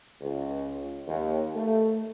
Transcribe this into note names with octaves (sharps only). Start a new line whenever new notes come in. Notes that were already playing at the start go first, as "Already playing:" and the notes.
C#2
D#2
A3